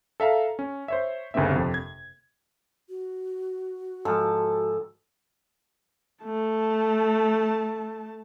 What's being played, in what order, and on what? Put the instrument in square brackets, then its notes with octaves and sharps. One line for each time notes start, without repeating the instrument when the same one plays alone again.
[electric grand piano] A4 E5 F5 A#5
C#4
C5 C#5 E5
G1 D#2 C#3 A#3 C4 E5
F2 C3
G#6
[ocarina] F#4
[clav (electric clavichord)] G#2 F3 [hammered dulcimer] A4
[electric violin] A3 A5